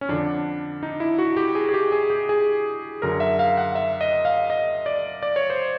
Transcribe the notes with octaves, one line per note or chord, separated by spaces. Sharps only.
C#4
F2 D3 D4
D#4
E4
F#4
G4
G#4
G#4
G4
G#4
G4
G#4
F#2 D3 A#4
E5
F5
F#5
E5
D#5
F5
D#5
D5
D5
C#5
C5